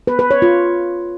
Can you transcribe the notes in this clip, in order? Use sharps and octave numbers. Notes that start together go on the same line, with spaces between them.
B4
B4
C#5
F4